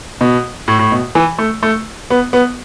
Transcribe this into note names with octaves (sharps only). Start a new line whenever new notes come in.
B2
A2
A2
B2
E3
A3
A3
B3
B3